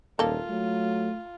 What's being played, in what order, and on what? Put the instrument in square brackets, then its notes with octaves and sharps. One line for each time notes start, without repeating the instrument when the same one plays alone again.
[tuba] D#1 [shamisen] A#3 A4 [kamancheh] F4
[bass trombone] F#3 [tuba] A3